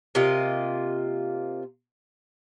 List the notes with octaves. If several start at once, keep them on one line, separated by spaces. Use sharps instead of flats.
C3 A#3 F4 D#5